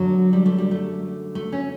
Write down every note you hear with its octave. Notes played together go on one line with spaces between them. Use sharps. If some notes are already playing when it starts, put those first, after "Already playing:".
Already playing: F#2 D3 F#3
G3
A3
G3
A3
A3
C#4